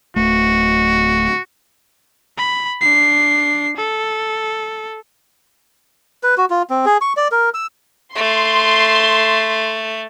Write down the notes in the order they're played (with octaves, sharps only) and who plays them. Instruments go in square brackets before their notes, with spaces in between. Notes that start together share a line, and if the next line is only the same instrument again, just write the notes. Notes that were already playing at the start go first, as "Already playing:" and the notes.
[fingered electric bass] D1 A3 [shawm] F#4
[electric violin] B5
D4 C7
A4
[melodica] B4
F#4
F4
C4
G#4
C#6
D5
A#4
E6
[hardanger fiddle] A3 [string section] C6